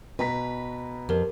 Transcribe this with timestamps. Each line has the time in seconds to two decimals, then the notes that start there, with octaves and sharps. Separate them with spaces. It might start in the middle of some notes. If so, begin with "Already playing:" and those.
0.19 B2 B4 A#5 B6
1.09 F2 G4 A#4